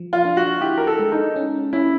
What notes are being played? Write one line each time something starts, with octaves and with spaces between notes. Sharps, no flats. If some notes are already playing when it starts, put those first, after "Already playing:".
Already playing: F3
F4
D4
F#4
E4 G4
A#4
A4
G#3
D#4
C#4
C#4 E4